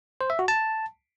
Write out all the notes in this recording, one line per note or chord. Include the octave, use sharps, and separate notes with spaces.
C5
E5
F#4
A5